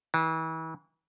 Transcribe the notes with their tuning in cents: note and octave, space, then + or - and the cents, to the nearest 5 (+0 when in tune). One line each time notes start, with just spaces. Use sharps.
E3 -35